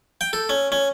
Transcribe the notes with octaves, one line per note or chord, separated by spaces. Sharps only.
G5
A4
C#4
C#4